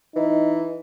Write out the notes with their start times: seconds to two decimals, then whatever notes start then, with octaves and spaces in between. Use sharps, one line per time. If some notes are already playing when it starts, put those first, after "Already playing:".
0.16 E3 D#4